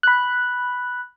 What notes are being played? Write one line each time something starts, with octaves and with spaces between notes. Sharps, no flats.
B5 F#6